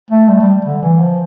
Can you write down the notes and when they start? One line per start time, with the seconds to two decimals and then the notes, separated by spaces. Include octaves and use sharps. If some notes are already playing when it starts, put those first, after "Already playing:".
0.11 A3
0.28 G3
0.40 G3
0.65 D3
0.83 E3
1.00 F3